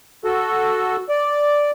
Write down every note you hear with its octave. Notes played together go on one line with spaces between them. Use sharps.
F#4 A4
D5